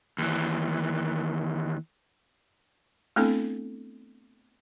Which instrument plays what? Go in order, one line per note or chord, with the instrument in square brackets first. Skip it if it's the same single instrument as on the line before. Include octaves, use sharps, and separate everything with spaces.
[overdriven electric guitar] D#2 E3
[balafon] A3 B3 C4 D4 E4 A4